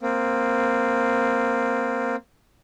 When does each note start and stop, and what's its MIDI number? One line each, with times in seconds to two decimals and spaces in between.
0.02 2.16 58
0.02 2.16 60